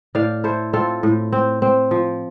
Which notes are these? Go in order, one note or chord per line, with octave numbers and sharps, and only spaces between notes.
A2 D5 F5
E4 A4 C5
C4 F4 A4
A2
C4
C4
F3